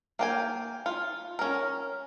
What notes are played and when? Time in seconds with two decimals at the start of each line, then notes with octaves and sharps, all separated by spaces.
0.19 A#3 G5 G#5
0.86 F4
1.39 C#4 A#4